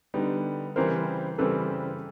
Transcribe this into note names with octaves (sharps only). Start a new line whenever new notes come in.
D3 G3 B3 D#4
C#3 E3 G3 C4 A#4 C5
C#3 E3 G3 C4 A4 B4